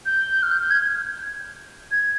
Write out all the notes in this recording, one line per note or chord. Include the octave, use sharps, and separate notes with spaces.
G6
F6
G6
G6
G#6
G#6